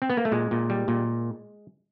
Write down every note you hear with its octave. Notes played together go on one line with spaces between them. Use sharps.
C4
B3
A#3
A3
A#2 G#3
A#2
G3
A#2